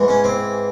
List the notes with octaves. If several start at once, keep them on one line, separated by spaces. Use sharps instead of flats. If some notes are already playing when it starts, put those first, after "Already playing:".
Already playing: G#2 E3 G#3
C#4
C4